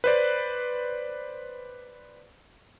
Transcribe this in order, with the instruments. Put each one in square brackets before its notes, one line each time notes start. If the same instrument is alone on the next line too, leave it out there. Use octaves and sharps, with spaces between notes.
[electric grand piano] B4 C5 D5